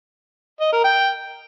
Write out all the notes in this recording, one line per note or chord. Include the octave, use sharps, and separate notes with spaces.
D#5
A#4
G5